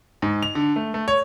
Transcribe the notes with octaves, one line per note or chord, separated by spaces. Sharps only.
G#2
F7
D3
A3
A3
C#5